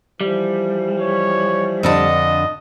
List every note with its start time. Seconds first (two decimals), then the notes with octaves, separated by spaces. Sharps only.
0.21 E3 F3 G3
1.00 C#5
1.83 F2 D3 D#5 A5